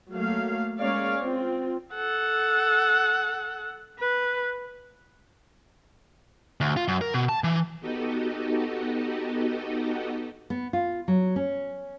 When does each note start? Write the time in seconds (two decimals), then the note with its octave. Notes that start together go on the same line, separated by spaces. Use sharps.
0.12 F#3 A3 A#3 F5
0.80 G#3 A#3 C#4 C#5 D5 F5
1.21 C4 F4
1.94 A4 F#5
3.99 B4
6.61 D2
6.77 F4
6.88 F#2
7.01 A#4
7.14 B2
7.29 A5
7.44 E3
7.81 B3 D#4 F#4 G4 A4 D#5
10.50 B3
10.73 F4
11.08 F#3
11.36 C#4